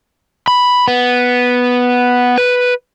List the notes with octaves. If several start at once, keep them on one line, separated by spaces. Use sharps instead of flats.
B5
B3
B4